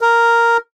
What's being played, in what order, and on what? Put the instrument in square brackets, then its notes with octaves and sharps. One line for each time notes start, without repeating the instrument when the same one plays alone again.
[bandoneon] A#4